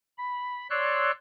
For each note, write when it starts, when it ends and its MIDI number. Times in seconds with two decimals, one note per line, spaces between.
0.18 0.68 83
0.70 1.11 73
0.70 1.11 74
0.70 1.11 84
0.70 1.11 88
0.70 1.11 90